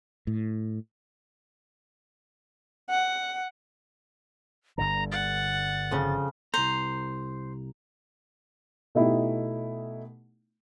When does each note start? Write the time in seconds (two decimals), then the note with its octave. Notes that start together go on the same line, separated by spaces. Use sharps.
0.27 A2
2.89 F#5
4.78 G1 G2 D3 A#5
5.12 F#5 A6
5.91 F2 C#3
6.54 C2 C5 A#5
8.95 B2 A3 D#4 E4 G4